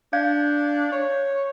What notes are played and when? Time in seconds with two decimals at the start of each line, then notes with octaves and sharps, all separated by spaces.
0.13 D4 F5 G6 G#6
0.92 C#5